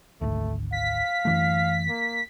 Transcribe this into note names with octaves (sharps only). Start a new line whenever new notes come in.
G#1 D2 A3
F5 B6
F#2 E3 A3
A#3